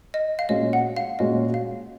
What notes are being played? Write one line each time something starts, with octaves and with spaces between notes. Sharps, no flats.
D#5
F5
A#2 G#3 C#4 F#4 D#5
F#5
F5
A#2 G#3 C#4 F#4 D#5
F5